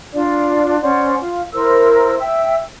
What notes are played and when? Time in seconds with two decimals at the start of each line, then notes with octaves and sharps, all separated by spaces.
0.14 D4 F4 D5
0.81 C#4 C5 D5 F#5
1.21 F4
1.53 E4 A#4 C5 E6
2.19 E5 G5 E6